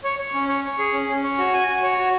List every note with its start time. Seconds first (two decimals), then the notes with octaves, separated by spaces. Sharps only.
0.04 C#5
0.19 C#5
0.34 C#4
0.48 C#5
0.64 C#5
0.79 G#4
0.93 C#4
1.08 C#4
1.23 C#5
1.38 F#4
1.53 G#5
1.68 F#4
1.83 C#5
1.98 F#4